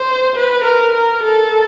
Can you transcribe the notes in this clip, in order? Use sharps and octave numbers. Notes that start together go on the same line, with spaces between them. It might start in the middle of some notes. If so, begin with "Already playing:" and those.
Already playing: C5
B4
A#4
A#4
A4